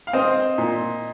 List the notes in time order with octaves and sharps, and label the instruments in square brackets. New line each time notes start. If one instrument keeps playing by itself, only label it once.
[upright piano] F5
[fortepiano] C4 [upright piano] C5 D#5
[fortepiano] A#2